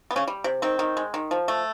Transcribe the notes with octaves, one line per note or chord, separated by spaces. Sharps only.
B3
C#3 C#4
G3
C3
D#3 C4
D#3
G#3
D#3
F3
A3